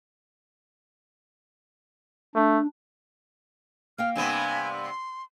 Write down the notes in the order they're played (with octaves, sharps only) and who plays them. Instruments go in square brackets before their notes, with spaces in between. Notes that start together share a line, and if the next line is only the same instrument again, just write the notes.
[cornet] A3 [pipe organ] D4
[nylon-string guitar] A#3 F5 G5 [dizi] F6
[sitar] G2 C3 B3 [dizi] G#5
[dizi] C6